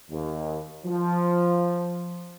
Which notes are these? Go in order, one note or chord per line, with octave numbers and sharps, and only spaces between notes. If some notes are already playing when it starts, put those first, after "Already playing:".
D#2
F3